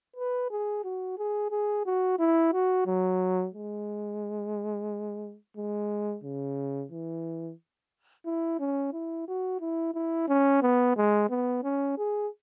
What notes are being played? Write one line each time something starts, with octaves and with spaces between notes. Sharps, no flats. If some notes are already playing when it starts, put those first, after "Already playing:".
B4
G#4
F#4
G#4
G#4
F#4
E4
F#4
F#3
G#3
G#3
C#3
E3
E4
C#4
E4
F#4
E4
E4
C#4
B3
G#3
B3
C#4
G#4